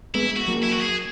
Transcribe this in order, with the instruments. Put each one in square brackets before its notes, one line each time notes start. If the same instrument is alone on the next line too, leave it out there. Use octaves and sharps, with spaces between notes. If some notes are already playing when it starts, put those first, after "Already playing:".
[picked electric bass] G#3 B3 [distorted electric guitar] E4
[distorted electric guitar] F#4
[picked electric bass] F#3 A#3
[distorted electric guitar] E4
F#4
G#4